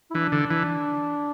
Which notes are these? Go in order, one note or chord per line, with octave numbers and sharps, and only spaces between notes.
E4
E3 D4
D3
E3